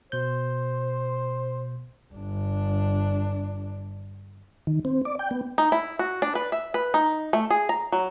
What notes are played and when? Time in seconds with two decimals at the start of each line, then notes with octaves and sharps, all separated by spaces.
0.12 B2 C5 G6
2.14 G1 D4
4.67 D#3
4.85 C4
5.05 D5
5.19 G5
5.31 B3
5.58 D#4
5.72 E4
5.99 F#4
6.22 D4
6.35 B4
6.52 E5
6.74 B4
6.94 D#4
7.33 A3
7.50 G#4
7.69 A#5
7.92 F#3